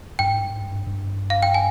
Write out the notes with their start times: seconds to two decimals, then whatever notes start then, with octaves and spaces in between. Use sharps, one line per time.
0.19 G2 G5
0.30 G#2
0.40 G2
0.51 G#2
0.61 G2
0.87 G2
1.30 F5
1.43 G5
1.54 G#5